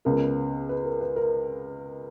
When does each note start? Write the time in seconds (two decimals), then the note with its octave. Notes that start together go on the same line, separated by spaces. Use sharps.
0.05 C#2 C#3 G#3 B3 A#4
0.69 B4
0.85 A#4
1.01 B4
1.16 A#4